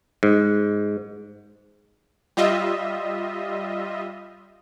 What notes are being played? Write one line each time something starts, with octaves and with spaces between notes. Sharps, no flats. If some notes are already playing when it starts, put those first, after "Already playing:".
G#2
G3 F4 D#5 E5